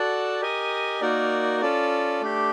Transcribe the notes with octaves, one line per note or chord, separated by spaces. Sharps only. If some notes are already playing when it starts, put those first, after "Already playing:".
Already playing: F#4 A4 D5 F#5 A5
G4 A#4 D#5 G#5
A#3 D#4 F#4 A#4 D5
C#4 F4 A4 D5
A3 D4 G4